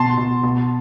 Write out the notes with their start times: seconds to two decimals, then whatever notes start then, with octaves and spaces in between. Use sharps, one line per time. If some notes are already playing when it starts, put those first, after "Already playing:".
Already playing: B2 A5 C6
0.17 B2
0.43 B2